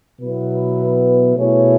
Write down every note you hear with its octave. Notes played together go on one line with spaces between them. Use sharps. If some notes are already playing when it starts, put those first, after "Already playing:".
B2 F#3 B3 E4 B4
B2 A3 E4 G#4 C#5